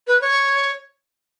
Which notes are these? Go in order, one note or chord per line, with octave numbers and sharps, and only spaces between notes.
B4
C#5